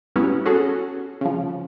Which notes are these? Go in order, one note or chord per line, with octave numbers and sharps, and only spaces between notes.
F#3 G3 B3 C#4 E4
C#4 F#4 G#4 A4
C#3 F3